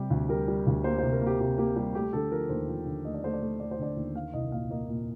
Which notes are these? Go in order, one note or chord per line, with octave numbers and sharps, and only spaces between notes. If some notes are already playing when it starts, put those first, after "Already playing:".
Already playing: C3 G3 G4
D2
G3 A#4
G3
D2
A#3 C5
C3 C5
A#4
A#3
G4
C3 G4
A#3 G4
G3 G4
A3 G4
D3 A4
F3 A#4
D#2 C5
F3
D3
A3 D#5
D5
A3 C5
D5
A3
A3 D5
C5
D3 D5
D#2
A#3 F5
C2 D#5
A#2 F5
A#3 D#5
A#2